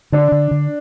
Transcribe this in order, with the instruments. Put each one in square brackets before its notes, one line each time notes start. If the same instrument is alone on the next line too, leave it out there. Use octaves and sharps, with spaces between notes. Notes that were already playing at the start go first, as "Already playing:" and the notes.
[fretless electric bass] D3 [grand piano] D4
[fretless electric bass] D3
D3